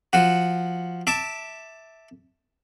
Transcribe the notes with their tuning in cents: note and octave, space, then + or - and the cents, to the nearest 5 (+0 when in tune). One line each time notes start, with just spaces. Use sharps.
F3 +0 F#4 +0 F#5 +0
E5 -10 A5 +10 D6 +0